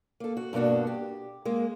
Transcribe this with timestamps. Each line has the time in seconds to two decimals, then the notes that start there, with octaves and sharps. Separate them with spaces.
0.20 A#3 A4
0.37 F#4
0.53 G2 B2 A#3 D4 F#4
0.87 G4
1.45 G#3 A#3